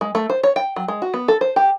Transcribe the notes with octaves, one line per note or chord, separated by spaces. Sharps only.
G#3
A3
C5
C#5
G5
F#3
G#3
F#4
B3
A4
C5
G4